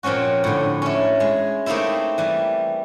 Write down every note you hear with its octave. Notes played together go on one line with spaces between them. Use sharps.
A#2 F3 C4 C#4 F#4
A2 D3
C#4 E4
G#3
A3 A#3 C4 D#4 E4 E5
E3 G3